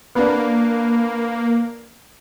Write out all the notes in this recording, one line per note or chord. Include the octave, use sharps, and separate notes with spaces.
A#3 B3 D4